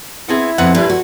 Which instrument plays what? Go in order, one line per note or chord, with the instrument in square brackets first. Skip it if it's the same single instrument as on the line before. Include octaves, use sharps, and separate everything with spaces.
[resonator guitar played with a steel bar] B3 C4 G#4 [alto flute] E4
[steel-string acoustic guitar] F2 [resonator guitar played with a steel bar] B3 C4 F#5
[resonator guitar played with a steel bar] A#2 B4 [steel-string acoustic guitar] G3 D4
[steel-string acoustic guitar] F#4